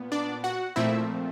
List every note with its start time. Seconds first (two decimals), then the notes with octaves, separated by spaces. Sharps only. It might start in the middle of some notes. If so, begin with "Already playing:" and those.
Already playing: A#2 B3
0.12 D4 D5
0.44 F#4 F#5
0.76 A#2 F3 A3 C4 E4 E5